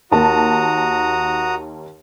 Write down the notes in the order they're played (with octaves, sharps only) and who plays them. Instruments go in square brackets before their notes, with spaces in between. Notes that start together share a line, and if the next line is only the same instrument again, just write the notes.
[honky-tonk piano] D#2 A#4 A5 [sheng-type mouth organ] F#4 A#5 D#6